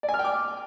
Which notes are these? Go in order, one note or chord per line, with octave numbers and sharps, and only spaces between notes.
D5
G#5
F6
G5
D6